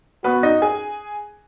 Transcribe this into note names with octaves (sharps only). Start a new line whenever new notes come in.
B3 F#4 B4
D#4 D#5
G#4 G#5